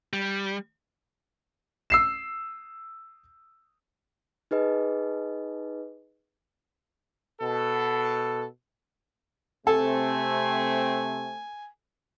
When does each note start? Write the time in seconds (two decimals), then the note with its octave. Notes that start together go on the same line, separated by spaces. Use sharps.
0.13 G3
1.90 E6 C7 E7
4.51 D#4 G#4 B4 D#5
7.42 B2 A4
9.67 C3 A3 C4 A4 G#5